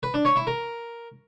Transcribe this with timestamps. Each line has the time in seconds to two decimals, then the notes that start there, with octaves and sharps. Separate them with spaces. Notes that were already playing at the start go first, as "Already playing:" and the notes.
0.03 B4
0.14 D4
0.25 C#5
0.36 E4
0.47 A#4